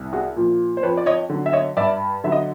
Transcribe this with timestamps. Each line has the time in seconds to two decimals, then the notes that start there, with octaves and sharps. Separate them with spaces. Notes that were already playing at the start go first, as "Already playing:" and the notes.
Already playing: C2
0.13 F#4 G#4
0.36 A#2 F3
0.77 C5
0.83 F2 B4 C#5
0.97 D5
1.06 C#5 D#5
1.30 D3 F#3
1.46 E5
1.53 C#5 D#5
1.77 G2 D5 E5
2.24 D3 F#3 E5
2.32 D#5